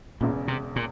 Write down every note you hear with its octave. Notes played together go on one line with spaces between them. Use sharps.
E1 E2 A#2 C#3
C3
A#2